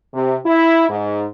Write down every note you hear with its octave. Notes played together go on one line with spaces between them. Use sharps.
C3
E4
G#2